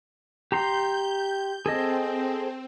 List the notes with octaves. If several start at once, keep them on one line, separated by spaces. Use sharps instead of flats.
G4 A#5 C6 G6
C4 G#4 A4 D#5